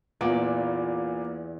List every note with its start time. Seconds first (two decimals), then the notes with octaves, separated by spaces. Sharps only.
0.21 E2 A#2 B3 D5